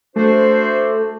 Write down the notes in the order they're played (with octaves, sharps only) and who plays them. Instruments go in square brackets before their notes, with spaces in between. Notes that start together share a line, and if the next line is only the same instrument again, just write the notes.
[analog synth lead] A3 [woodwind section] D4 F#4 C5